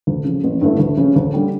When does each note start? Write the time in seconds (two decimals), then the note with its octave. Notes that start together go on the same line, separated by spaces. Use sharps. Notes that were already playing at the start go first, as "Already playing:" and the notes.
0.07 D2
0.25 C#3 F3
0.44 A1
0.61 G2 D3 A3 E4
0.79 D2
0.97 C#3 F3 C#4
1.16 D2
1.34 D3 G3